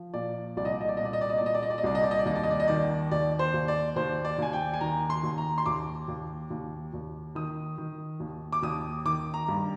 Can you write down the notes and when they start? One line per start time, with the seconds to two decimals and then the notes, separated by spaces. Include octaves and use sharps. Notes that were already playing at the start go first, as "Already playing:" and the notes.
Already playing: F3
0.14 A#2 D5
0.57 C2 D5
0.65 D#5
0.73 D5
0.81 D#5
0.89 D5
0.97 A#2 D#5
1.05 D5
1.13 D#5
1.21 D5
1.30 D#5
1.38 A#2 D5
1.46 D#5
1.55 D5
1.62 D#5
1.70 D5
1.78 D#5
1.83 C2 D5
1.95 D#5
2.03 D5
2.11 D#5
2.19 D5
2.26 D#2 D#5
2.35 D5
2.43 D#5
2.51 D5
2.60 D#5
2.68 D#3 D5
3.11 D#2 D5
3.39 C5
3.54 D#2
3.68 D5
3.96 D#2 C5
4.25 D5
4.38 D#2 G#5
4.53 G5
4.74 G#5
4.81 D#3 A#5
5.10 C6
5.23 D#2
5.38 A#5
5.58 C6
5.66 D#2 D6
6.08 D#2
6.50 D#2
6.94 D#2
7.35 D#3 D#6
7.78 D#3
8.20 D#2
8.53 D6
8.63 D#2 D#6
9.05 D#3 D6
9.34 A#5
9.48 G2